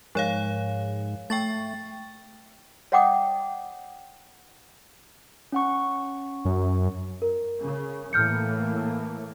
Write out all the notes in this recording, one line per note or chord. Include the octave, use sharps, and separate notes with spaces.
G#2 F3 C#5 F5
A3 G5 C#6 A6
C#5 D#5 F#5 G5 D6 D#6
C#4 F#5 C#6
F#2
A#4
C#3
A2 E3 A#3 F6 G6 C#7